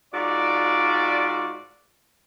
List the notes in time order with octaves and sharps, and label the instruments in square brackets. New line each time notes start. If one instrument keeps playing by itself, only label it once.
[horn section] G#2 F4 F#4 D5